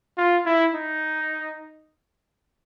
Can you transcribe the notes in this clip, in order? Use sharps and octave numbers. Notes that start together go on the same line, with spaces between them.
F4
E4
D#4